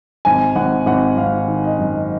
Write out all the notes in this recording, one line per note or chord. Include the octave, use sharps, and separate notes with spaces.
G#1 G#5
G#1 F#5
G#1 F#5
G#1 F5
D#3
D#5
F#2